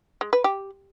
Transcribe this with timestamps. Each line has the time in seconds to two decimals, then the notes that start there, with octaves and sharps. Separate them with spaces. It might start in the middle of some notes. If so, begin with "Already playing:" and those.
0.21 G#3
0.33 B4
0.44 G4